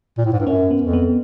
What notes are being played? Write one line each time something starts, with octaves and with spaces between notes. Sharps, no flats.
A#2
A2
G#2
G2
F#2 C#4
B3
F2
B3